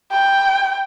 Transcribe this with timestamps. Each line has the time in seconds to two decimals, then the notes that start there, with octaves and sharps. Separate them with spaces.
0.11 G5